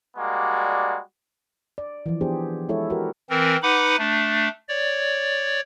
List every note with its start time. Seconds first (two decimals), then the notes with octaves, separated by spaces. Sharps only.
0.17 G3 G#3 A#3 F#4 D5
1.78 D5
2.06 E3 F3
2.21 B3 D4 G4 G#4 C5
2.69 G#3 E4 A4 C#5
2.90 F#4 G4 A#4 B4
3.30 E3 C4 A#4
3.62 D#4 B4 F#5 B5 D6
3.98 A3 D4
4.69 C#5 D5